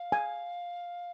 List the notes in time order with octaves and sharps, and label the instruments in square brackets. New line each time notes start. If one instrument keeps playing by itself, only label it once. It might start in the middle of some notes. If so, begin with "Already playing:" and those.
Already playing: [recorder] F5
[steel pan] G#5